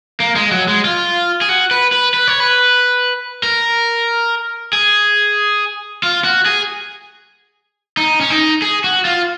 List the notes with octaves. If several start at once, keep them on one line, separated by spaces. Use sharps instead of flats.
A#3
G#3
F#3
G#3
F4
G#4
F#4
B4
B4
B4
C#5
B4
A#4
G#4
F4
F#4
G#4
D#4
C#4
D#4
G#4
F#4
F4